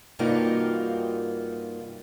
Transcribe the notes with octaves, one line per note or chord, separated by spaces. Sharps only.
G2 C3 A#3 D#4 F4 F#4